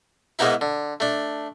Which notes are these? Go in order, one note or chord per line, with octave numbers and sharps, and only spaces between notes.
G#2 G#3 A#3 B3 D#4 E4
D3
A3 D4